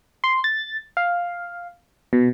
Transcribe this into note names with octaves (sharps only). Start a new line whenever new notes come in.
C6
A6
F5
B2